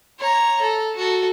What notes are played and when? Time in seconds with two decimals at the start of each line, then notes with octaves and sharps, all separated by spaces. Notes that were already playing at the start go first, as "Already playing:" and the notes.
0.19 C#5 A#5
0.61 A4
0.96 F#4 A4